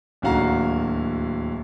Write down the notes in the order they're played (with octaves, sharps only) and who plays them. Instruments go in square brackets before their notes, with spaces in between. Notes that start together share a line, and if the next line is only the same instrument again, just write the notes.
[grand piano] D1 D#2 D3 F#4 F5 A#5